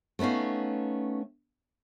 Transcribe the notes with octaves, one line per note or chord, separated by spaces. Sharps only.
A3 B3 C#4 D#4 F5